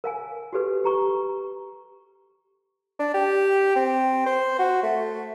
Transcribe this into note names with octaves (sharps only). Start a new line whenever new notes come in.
A#4 F5 G#5
F#4 G4 A4 B4
G4 A#5 C#6
D4
G4
C4
C5
F#4
A3